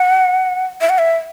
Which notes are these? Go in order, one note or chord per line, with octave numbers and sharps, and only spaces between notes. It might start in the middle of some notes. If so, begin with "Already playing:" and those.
Already playing: F#5
E5
F#5
E5